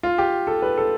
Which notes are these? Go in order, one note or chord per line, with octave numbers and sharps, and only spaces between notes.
F4
G4
A4
B4
A4